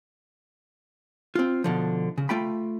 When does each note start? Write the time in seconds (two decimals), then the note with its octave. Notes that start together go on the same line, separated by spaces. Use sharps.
1.35 C4 F4
1.64 B2 D3 F3
2.18 C#3
2.29 A3 F4 G5 B5